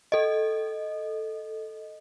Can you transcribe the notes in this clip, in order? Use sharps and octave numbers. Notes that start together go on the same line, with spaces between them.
A4 D#5